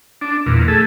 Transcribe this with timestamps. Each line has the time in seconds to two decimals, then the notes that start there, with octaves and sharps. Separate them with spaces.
0.21 D4
0.46 E2 A#2
0.68 A3 G#4 A4